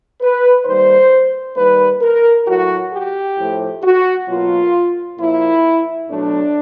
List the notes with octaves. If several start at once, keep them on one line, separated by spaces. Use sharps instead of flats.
B4
D#3 G3 A#3 C5
D#3 G3 A#3 B4
A#4
A2 F#3 A3 F#4
G4
A2 F3 A3
F#4
B2 F#3 A#3 F4
A#2 F3 A#3 E4
B2 F#3 A3 D4